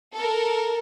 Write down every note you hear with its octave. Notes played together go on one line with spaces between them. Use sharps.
A4 A#4